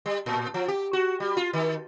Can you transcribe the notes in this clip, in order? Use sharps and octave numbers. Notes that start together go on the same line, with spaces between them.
G3
A2
F3
G4
F#4
G3
F4
D#3